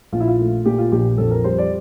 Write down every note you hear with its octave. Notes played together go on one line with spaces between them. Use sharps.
A#1 F4
E4
F4
A3
A#2 G4
F4
A#1 G4
F2 A4
A#4
G3 C5
D5